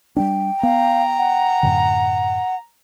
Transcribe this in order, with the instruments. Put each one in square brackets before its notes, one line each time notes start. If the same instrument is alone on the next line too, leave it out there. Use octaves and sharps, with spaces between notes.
[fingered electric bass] G3 A#3 D4 [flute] G5
[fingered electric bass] B3 [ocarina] F5 [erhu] A#5
[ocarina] F#5
[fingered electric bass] F#2 A2 D3